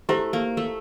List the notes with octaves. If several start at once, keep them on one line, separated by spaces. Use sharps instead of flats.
A3 E4 G4 C5 E5
A#3
A3